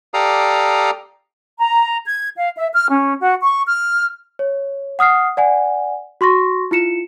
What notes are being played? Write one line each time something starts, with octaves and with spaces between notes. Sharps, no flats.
G4 A4 D5 F5 A#5 D#6
A#5
G#6
F5
E5
F6
C#4
F#4
C#6
F6
C#5
F#5 D#6 F6 C7
D5 F#5 G#5
F#4 C6 C#6 A#6
E4 F4 C#7 E7